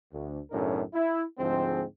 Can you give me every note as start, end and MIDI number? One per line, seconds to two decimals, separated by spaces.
0.12 0.39 38
0.51 0.82 35
0.51 0.82 42
0.51 0.82 45
0.51 0.82 49
0.51 0.82 62
0.51 0.82 70
0.94 1.22 64
1.39 1.83 38
1.39 1.83 44
1.39 1.83 53
1.39 1.83 56
1.39 1.83 60